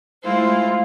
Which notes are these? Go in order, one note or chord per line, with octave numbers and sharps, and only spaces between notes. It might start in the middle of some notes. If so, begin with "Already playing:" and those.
G#3 A3 E4 F4 C5